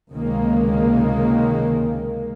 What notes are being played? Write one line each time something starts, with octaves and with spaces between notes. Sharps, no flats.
C#2 C3 D#3 G#3 A#3